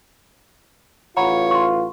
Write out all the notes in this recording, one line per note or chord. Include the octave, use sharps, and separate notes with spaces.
A1 F4 C#5 F#5 A#5 B5
C6 C#6